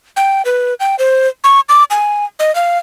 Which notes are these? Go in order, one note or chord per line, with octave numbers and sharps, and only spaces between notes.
G5
B4
G5
C5
C#6
D6
G#5
D#5
F5